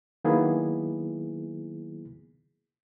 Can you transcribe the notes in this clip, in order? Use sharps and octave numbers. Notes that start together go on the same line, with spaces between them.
D#3 F#3 A#3 B3 E4 G#4